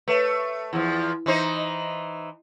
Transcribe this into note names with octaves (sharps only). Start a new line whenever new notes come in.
A3 B4 C#5
E2 F3 E4
E3 D#4 C5
D#5